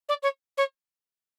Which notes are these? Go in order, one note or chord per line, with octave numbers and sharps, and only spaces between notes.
D5
C#5
C#5